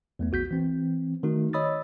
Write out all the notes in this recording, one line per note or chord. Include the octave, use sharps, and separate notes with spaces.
E2 A3 B3
A#1 F#4 G6 B6
E3 C4
D#3 A3 D#4 F#4
C#5 D#5 B5 D#6 E6 A6